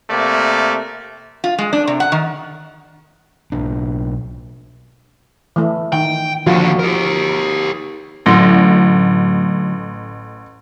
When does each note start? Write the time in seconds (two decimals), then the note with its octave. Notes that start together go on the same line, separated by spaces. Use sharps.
0.10 C3 A3 A#3 D5
1.44 F4
1.58 G#3
1.73 D4
1.87 C3
2.00 F#5
2.12 D#3
3.52 B1 D4
5.56 E3 A3
5.93 D#3 G5
6.47 D#2 D3 F3 F4 F#4
6.79 G4 A#4
8.26 A1 D2 F#3 C6 A#6